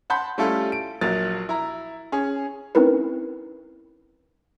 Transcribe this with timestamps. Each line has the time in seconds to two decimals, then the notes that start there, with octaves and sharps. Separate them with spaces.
0.10 F#5 A5 B5 C6 G6
0.38 G3 A3 C#4 E4 F4 A4
0.72 D7
1.01 A#1 F#3 A#3 A6
1.49 E4 A#5
2.12 C#4 G#4
2.75 C4 C#4 D#4 E4 A#4 B4